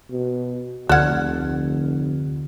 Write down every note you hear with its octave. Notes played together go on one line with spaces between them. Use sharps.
B2
F1 D2 D3 A4 F#5 F6 G#6